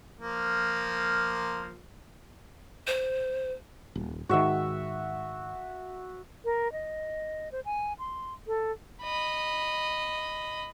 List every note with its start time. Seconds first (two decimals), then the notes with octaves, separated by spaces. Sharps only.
0.19 F3 A#3
2.87 C5
3.95 D#1
4.29 G#2 D#3 F#4 E5
6.45 A#4
6.73 D#5
7.52 C5
7.65 G#5
7.99 C6
8.47 A4
9.03 D#5 B5